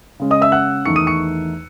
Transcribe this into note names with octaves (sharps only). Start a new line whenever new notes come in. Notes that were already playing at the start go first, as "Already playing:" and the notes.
C#3 G#3 C#4
D#5 D#6
E5 E6
F#5 F#6
E2 D#3 A3 D#4 C#6 C#7
D#6 D#7
C#6 C#7